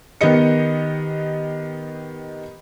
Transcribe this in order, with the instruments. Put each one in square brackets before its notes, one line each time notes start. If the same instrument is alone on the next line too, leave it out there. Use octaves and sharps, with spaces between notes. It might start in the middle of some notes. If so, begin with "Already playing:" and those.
[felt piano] D#3 B3 G4 D#5 C#7